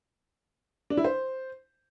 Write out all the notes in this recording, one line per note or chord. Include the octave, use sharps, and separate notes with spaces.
D4
E4
C5